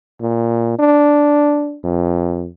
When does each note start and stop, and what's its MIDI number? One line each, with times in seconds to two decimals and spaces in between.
0.21 0.76 46
0.79 1.77 62
1.84 2.47 41